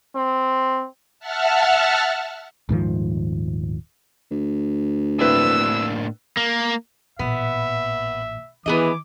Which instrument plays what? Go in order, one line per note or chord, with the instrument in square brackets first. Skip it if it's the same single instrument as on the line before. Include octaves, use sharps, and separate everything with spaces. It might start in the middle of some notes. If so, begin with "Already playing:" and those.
[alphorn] C4
[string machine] E5 F#5 A5 F6
[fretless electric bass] D#1 G#2 D#3 F3
[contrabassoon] D2
[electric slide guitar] A2 A#3 D4 [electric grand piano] C4 E4 B4 [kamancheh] E6
[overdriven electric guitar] A#3
[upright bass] A1 A#2 [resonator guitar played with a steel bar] B3 [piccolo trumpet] E5
[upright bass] D#3 [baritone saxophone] E3 [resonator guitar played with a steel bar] B3 G#4 D#5 [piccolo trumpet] D6